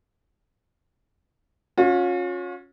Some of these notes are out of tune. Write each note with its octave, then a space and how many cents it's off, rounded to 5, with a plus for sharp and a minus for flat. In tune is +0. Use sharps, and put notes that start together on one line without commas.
C#4 +0 F4 +40